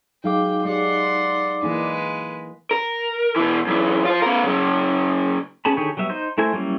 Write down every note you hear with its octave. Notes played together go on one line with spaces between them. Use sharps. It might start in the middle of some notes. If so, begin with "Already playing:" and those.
F#3 G#3 D#4 F5 G5 D6
G#3 G4 D5 F#5 C6
E3 G#3 A#3 D#4 B4
A#4
B2 E3
F#2 E3
F4 C5
B3 A#4
C#3 F#3
B3 C#4 G#4 A5 B5
D3 D#3 G4 G#4 C#5
F#3 G3 B3 E5
D#4 C5
A3 E4 A#4 C5 G#5
F#3 G3 A#3 C#4 E4